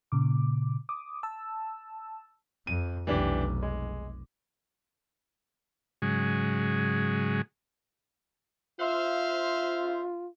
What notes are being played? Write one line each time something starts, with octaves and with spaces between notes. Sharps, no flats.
A#2 C#3 D6
D6 D#6
A5 E6
F2 D#7
F1 B1 E3 D4 G4
G#3
G#2 C#3 F#3 G#3
F4 C5 E5 F5